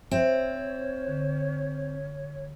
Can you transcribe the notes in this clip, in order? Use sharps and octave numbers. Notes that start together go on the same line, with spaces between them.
C4 C5 C#5 E5
D3